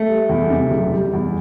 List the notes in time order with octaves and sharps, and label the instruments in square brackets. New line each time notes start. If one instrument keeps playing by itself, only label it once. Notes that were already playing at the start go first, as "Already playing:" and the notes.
Already playing: [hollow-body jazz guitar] A3
[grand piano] G3
E2
C3
F#1
G3
E2